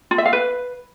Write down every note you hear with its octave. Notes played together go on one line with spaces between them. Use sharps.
F4
E5
F5
B4